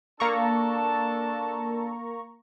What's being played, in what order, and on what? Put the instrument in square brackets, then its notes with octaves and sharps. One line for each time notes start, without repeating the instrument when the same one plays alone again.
[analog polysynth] A#3 A#5 C#6 [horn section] D4 A4 A5